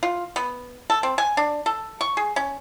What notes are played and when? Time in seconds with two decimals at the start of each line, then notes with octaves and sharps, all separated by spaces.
0.03 F4
0.36 B3
0.90 A4
1.03 C4
1.18 G#5
1.37 D4
1.66 A4
2.01 C#6
2.17 G#4
2.36 C#4